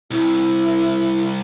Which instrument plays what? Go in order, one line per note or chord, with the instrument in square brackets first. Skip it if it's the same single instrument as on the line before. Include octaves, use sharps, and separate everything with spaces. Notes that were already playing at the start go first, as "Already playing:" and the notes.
[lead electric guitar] C2 [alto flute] E4